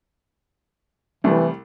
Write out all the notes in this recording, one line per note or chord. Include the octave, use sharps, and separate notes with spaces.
C2 E3 G3 A3